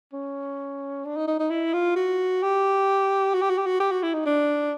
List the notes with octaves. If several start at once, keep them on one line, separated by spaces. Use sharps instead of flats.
C#4
D4
D#4
D#4
D#4
E4
F4
F#4
G4
F#4
G4
F#4
G4
F#4
G4
F#4
E4
D#4
D4